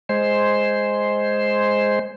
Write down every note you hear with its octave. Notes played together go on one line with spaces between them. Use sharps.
G#3 C5